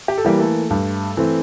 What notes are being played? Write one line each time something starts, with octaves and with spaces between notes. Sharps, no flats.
G4
A4
E3 G3 A#3 G4
A3 A4
G2
E3 A3 C4